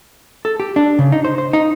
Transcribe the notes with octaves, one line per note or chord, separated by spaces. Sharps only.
A4
G4
D4
C#3
D#4
C5
C5
D#4